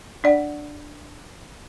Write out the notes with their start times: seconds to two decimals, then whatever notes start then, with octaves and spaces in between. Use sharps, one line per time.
0.24 D4 D5 F#5